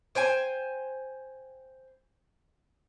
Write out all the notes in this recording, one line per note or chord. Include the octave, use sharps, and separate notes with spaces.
C5 G5 G#5